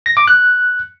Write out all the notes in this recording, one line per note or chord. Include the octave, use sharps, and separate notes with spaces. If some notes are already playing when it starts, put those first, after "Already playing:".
A#6
D6
F#6